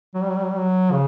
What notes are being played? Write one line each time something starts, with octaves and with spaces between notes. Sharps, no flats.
F#3
G3
F#3
G3
F#3
G3
F#3
C#3